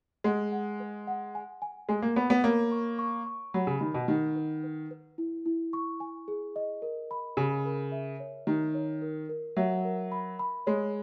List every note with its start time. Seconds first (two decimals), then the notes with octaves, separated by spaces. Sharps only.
0.24 G#3 F#5
0.52 F#5
0.80 B4
1.07 F#5
1.35 G#5
1.62 G#5
1.89 G#3 G#5
2.02 A#3
2.16 B3 B5
2.30 B3
2.44 A#3 C#5
2.72 C#6
2.99 C#6
3.27 C#6
3.54 F#3 B5
3.67 C#3
3.81 D#3 B5
3.94 B2
4.08 D#3 F#5
4.36 B4
4.64 B4
4.91 B4
5.18 E4
5.46 E4
5.73 C#6
6.00 G#5
6.28 G#4
6.56 D#5
6.82 A#4
7.11 B5
7.37 C#3 G#5
7.65 A#4
7.92 E5
8.20 C#5
8.47 D#3 A#5
8.75 C#5
9.02 A#4
9.29 A#4
9.57 F#3 E5
9.85 A#4
10.12 B5
10.39 B5
10.67 G#3 C#5